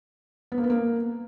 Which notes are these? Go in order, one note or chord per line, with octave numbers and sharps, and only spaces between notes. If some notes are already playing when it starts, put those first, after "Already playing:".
B3
A#3
B3
A#3